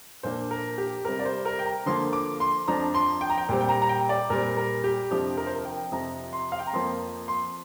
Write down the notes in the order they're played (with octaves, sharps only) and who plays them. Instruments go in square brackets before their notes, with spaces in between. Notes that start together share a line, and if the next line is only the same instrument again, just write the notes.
[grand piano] A#2 F3 A#3 D4 C5
A#4
G4
C3 G3 C4 A#4
D5
C5
A#4
G5
A#5
D3 F3 A#3 C6
D6
C6
F2 F3 D4 A#5
C6
G5
A#5
G5
A#2 G3 C4
G5
A#5
A#5
G5
D5
A#2 G3 C4 A#4
A#4
G4
F2 C3 F3 D4 G4
A#4
C5
A#4
G5
F2 C3 F3 A#5
C6
F5
G5
A#5
F2 F3 A#3 C6
C6